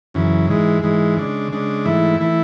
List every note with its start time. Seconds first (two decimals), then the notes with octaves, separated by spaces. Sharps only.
0.14 F#2 C#3 E3
0.48 G#2 E3 G#3
0.82 G#2 E3 G#3
1.17 C#3 G#3 D4
1.52 C#3 G#3 D4
1.85 G#2 E3 A3 E4
2.20 E3 A3 E4